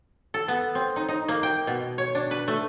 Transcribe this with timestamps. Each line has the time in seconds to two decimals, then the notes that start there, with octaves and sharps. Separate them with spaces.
0.34 A4
0.48 B3
0.75 C4
0.96 D#4
1.09 D#4
1.28 A#3
1.43 G5
1.67 B2
1.98 C#5
2.15 D4
2.31 B4
2.48 A3